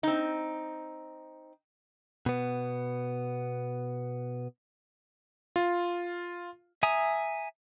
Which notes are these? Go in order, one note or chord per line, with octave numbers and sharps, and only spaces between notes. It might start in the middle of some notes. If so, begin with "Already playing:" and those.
C4 D#4
B2 B3
F4
E5 G#5 A#5 D#6